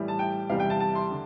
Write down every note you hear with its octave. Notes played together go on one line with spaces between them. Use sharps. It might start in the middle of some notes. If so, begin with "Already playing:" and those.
Already playing: A2 E3 G3
A5
G5
E2 C3 E3 G3 F5
G5
A5
A5
C6
D3